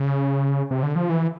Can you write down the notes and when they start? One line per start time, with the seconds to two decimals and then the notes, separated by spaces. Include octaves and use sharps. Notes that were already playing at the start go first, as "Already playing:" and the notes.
Already playing: C#3
0.71 C3
0.83 D3
0.96 F3
1.10 E3